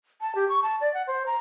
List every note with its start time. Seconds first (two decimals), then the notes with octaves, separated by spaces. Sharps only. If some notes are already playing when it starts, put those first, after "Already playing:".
0.21 A5
0.35 G4
0.49 C#6
0.63 A5
0.81 D5
0.94 F#5
1.07 C5
1.26 A#5